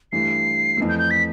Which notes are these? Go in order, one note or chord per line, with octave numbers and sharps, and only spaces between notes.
G2 E3 A3 C7
F2 E3 A3
G6
G6
B6